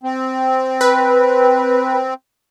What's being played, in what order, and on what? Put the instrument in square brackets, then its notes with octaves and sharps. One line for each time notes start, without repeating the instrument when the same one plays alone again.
[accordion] C4
[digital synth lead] B4